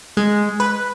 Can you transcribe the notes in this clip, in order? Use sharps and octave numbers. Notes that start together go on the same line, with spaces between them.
G#3
B4